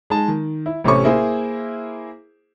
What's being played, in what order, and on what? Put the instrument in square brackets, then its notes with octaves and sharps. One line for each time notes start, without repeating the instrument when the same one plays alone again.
[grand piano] G#3 D#4 A5
D#3
E4
A1 C3 A3 C#4 C#6
A#3 E4 G#4 C5